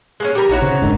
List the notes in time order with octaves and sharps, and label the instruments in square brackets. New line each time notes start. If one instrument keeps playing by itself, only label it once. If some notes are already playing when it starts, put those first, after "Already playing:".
[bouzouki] G#3 A#3 C#4
[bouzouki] G3 A#4 [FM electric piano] B5 D6
[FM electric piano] A#1 D#4 E4 [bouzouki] F#4 C#5 A#5
[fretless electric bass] C#3 [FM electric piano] C5
[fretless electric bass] F1 G#2 [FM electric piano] D4 D#4 A#4